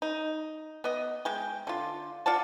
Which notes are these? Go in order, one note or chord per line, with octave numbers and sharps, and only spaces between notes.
D#4
B3 D#5
G#3 G5
D3 F4
F4 D5 F#5 A5